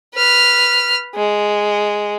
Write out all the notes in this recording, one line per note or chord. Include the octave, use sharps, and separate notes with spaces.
B4 F6
G#3